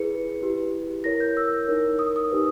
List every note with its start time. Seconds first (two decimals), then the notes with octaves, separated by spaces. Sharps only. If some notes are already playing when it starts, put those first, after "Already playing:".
Already playing: E4 G#4 B4 C#7
0.42 E4 G4 B4
1.04 E4 A#4 C#5 A#6
1.20 G6
1.37 E6
1.67 D#4 A#4 C#5
1.99 D#6
2.16 D#6
2.31 D#4 G4 B4